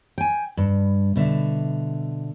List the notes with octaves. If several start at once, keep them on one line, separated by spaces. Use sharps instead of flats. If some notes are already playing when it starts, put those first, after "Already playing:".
G5 G#5
G2
B2 D3 E5